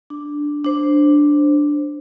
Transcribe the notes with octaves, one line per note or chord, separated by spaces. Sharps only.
D4
D4 C5